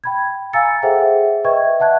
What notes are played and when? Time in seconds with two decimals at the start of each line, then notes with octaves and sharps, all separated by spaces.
0.04 G5 B5 G#6
0.53 F5 G#5 A#5 E6 A6 C#7
0.83 G#4 A4 C5 E5 F#5 G5
1.44 B4 D#5 E5 G5 C#6 G#6
1.80 E5 F#5 A5 F#6 G#6